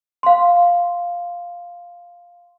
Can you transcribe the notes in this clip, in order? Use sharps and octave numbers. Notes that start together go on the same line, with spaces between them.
F5 C6